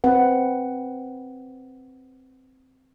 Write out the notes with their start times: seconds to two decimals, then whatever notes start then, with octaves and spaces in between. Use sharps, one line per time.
0.04 C4 B4 F#5